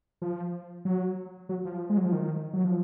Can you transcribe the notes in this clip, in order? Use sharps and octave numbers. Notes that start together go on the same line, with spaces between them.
F3
F#3
F#3
F3
G#3
F#3
F3
D#3
F#3
F3